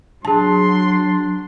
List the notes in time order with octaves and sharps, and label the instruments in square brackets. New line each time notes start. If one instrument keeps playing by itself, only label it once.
[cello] F#3 [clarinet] D4 [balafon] G#4 A5 [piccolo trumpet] C6